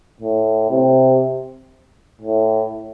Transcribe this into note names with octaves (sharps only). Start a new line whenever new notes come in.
A2
C3
A2